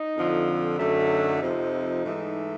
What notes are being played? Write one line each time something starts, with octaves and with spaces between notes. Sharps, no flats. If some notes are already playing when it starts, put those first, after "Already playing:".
Already playing: D#4
F2 D3 F3
F#2 D3 F#3 A3 D#4
F2 C3 F3
G#2 E3 A3